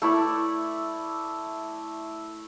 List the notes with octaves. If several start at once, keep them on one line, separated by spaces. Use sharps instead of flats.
A3 E4 D5